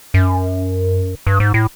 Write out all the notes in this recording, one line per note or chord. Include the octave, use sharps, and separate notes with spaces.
F#2
G2
G#2
A2